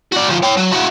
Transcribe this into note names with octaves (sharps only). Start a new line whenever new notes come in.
F#4 D5
D2 F3
C#5 G5
F#3
E4 F#4